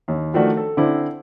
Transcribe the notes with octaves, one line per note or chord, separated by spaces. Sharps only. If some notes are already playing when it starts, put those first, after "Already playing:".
D#2
D#3 F3 A3 D4 F#4
A4
D3 C4 E4